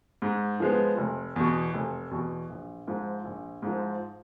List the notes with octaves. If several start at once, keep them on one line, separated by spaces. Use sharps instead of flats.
G#2
F3 G#3 B3
F1
E2 B2
F1
E2 B2
A#1
G#2 F3
A#1
G#2 F3